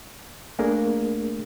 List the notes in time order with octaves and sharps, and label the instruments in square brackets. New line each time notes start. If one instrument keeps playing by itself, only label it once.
[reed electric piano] A3 A#3 D4 G#4 A#4